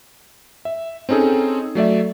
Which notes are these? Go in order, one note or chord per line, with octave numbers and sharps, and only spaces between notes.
E5
C4 C#4 D#4 G#4 A4
F#3 A3 D5 E5